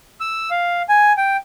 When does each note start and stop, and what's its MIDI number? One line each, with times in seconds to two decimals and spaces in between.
0.20 0.50 88
0.51 0.82 77
0.89 1.13 80
1.17 1.37 79